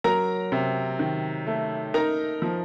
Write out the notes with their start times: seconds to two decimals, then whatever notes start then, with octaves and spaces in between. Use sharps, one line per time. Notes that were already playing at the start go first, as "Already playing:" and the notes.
0.04 F#3 A#4 A#5
0.52 C3
0.99 D#3
1.47 A3
1.94 D#4 A#4 A#5
2.42 F3